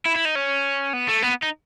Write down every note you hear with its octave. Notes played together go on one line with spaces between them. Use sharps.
E4
E4
D#4
C#4
B3
A3
B3
D#4